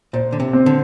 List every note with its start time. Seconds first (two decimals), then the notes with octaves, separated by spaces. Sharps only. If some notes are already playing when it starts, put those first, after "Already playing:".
0.13 A#2 C5
0.32 D3
0.40 C3
0.53 C4
0.66 D3